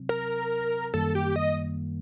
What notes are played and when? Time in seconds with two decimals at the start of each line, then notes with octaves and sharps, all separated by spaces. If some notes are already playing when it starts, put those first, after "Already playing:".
Already playing: C3 F#3 C4
0.09 A#4
0.94 F#2 D#3 G3 A#3 A4
1.15 G4
1.36 D#5